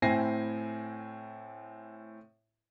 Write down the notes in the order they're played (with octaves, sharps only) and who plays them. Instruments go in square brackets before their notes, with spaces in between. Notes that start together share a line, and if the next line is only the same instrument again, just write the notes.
[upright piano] A2 C4 E4 G#5 A#6 C7